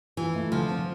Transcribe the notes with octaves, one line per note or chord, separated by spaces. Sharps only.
E3 F3
A3
D3 F3
C4